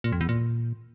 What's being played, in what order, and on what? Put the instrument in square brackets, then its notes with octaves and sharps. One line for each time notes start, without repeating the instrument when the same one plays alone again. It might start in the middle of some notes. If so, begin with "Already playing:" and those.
[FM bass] A#2
F2
E2
A#2